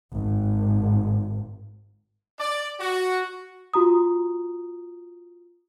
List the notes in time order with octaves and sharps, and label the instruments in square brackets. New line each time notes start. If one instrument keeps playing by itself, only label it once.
[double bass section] G#1
[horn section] D5
F#4
[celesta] F4 F#4 A#5 D#6